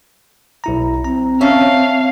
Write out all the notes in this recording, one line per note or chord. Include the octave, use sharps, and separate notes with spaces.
B1 E4 A#5
C4 A#5
C#4 E5 F5 A5 F6